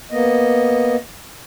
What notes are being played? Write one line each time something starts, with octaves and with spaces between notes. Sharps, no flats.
A#3 B3 D#5